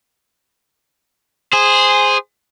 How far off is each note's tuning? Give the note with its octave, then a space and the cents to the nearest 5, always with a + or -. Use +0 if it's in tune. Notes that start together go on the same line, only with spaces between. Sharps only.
G#4 -10 C5 -5